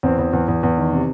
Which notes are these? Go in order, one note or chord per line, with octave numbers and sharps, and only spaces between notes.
E2 C4
E2
E2
E2
E2
D#3
C3